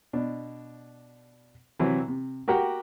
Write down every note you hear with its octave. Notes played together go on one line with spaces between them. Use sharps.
B2 D4
C3 E3 F#3 C4 E4
C3
F#4 G4 A#4 F#5 G5